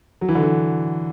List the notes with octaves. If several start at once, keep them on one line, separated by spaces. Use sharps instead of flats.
F#3
E3
D3
E3